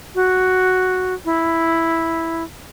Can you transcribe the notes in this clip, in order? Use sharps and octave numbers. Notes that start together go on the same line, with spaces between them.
F#4
E4